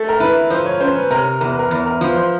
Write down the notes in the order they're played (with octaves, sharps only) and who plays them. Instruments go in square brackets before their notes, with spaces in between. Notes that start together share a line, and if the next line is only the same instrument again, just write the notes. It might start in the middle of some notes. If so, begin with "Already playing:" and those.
Already playing: [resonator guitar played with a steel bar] A3 [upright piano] A4
[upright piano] A#4
[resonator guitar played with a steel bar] E4 [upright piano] B4
[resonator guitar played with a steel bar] F3 [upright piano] C5
[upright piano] C#5
[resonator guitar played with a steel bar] C#4 [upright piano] C5
[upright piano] B4
[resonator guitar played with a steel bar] C3 [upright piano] A#4
[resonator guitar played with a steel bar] E2 [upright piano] A#4
[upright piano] B4
A#4
[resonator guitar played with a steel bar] E2
[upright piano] A#4
[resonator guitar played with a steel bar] F3 [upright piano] B4
[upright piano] C5